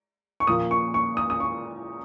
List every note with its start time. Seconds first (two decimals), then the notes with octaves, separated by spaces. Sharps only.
0.40 C#6
0.47 A#2 F3 A#3 D#6
0.71 C#6
0.94 C#6
1.17 D#6
1.30 D#6
1.40 C#6